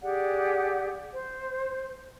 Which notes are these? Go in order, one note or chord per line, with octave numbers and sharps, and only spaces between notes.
G4 G#4 D5 F#5
C5